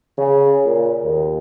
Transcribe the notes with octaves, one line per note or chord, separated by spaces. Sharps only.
C#3
A#2
D#2